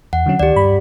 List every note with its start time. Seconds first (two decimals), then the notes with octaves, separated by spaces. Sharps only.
0.13 E2 F#5
0.26 D3 F#3 C#4
0.39 D2 D#3 G4 D5
0.56 G2 B5